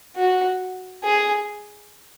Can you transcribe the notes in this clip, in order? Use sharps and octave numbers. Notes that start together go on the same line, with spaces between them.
F#4
G#4